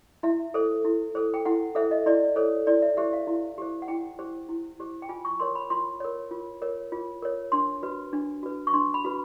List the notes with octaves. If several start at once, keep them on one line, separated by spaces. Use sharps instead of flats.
E4 E5
A4 C5
E4
A4 C5
G5
E4 F#5
A4 C5 E5
D#5
E4 D5
A4 C5 C#5
E4 D5
E5
G4 C5 E5
F5
E4
G4 C5
F#5
E4 G5
G4 C5
E4
G4 C5
G5
F4 G#5
C#6
A#4 C#5 C6
B5
F4 C6
A#4 C#5
F4
A#4 C#5
F4
A#4 C#5
D4 C6
F#4 B4
D4
F#4 B4
C#6
D4 C6
B5
F#4 B4